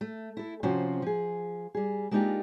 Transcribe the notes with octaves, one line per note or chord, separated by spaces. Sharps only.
A3
E4 A4
C3 F3 C#4 F4 F#4 C5
F3 G#4
G3 G#4
G#3 A#3 D4 D#4 F4 G4